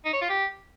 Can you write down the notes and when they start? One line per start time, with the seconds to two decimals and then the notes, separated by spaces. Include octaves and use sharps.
0.06 D#4
0.14 C#5
0.21 F4
0.29 G4